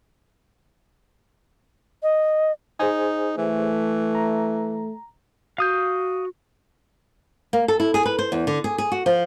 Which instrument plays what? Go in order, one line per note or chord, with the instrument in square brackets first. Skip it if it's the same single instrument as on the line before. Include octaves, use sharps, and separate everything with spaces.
[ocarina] D#5
[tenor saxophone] D#4 [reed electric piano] G#4 C5 G#5
[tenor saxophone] E3 [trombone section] A3
[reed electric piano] A#5
[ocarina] F#4 [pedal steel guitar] F5 D#6 G6
[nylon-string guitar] A#3
A4
E4
G#4
B4
C5
E2
D3
G#4
G#4
F#4
F3